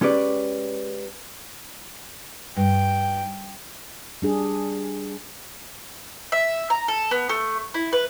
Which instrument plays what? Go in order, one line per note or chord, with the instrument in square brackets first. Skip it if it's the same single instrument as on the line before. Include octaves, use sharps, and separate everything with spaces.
[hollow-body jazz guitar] G#3 C#4 G4 B4 D5
[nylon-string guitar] G2 [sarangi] G5
[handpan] G3 D4 G#4
[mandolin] E5
A#5
A4
B3
A3
E4
B4